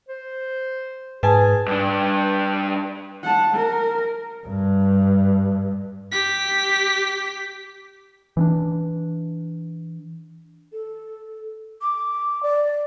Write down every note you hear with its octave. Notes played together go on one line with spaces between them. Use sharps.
C5
G#2 G#4 B4 G#5 A5
G2 D4
F#5 A5
A#4
G2
G4 B6
E3 C4 D4
A4
D6
D5